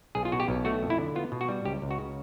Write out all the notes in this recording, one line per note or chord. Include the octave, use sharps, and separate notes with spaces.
B1 G#4
F4
B2 F#4
G4
B1
A3 F#4
F2
E4
D3
B3 F4
B2
F#4
G3
C#2 G4
C#2
F#4
C#3